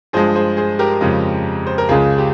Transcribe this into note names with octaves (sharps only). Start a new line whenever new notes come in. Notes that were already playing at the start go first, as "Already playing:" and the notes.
G2 F3 G#3 G#4 C5
G#4 C5
G#4 C5
G4 A#4
F2 C#3 F3 G#3
C5
A#4
C#2 C#3 G#3 F4 G#4
G4